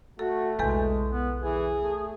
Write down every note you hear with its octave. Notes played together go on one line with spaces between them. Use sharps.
A3 F#4 A4
B1 E2 C#3 G#3 A4 B4
B3
E3 G#4
A3